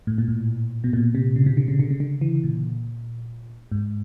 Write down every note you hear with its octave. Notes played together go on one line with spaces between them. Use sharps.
A2
A#2
A2
B2
A#2
C3
C#3
C3
D3
C#3
D3
C#3
D3
E3
A#2
G#2